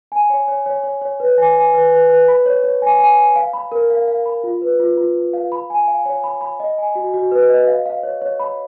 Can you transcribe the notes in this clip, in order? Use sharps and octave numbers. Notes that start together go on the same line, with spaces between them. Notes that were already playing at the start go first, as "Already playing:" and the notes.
G#5
C#5
C#5
C#5
C#5
C#5
B4
G#5
G#5
B4
B4
B4
B5
C#5
C#5
G#5
G#5
G#5
F5
B5
A#4
F5
F5
B5
F4
B4
F4
F4
F4
F5
B5
G#5
F5
C#5
B5
B5
D#5
G#5
F#4
F#4
B4
D#5
F5
F5
C#5
C#5
B5